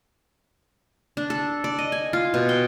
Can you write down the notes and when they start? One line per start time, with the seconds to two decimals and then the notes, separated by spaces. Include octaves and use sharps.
1.17 D4
1.30 A4
1.64 D5
1.79 D#5
1.92 G#5
2.13 F4
2.34 B2
2.49 G5